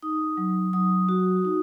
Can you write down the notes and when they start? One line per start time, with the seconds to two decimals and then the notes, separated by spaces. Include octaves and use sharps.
0.02 D#4 D#6
0.37 F#3
0.73 F#3 D#6
1.09 F#4
1.45 D#4